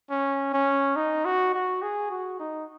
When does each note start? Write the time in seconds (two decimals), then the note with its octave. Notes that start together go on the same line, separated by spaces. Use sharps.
0.10 C#4
0.54 C#4
0.96 D#4
1.25 F#4
1.54 F#4
1.82 G#4
2.11 F#4
2.40 D#4